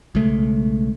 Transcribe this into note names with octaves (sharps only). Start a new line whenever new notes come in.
B1 C#3 G#3 A3